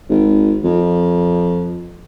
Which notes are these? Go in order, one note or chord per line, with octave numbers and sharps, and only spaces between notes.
G#1
F2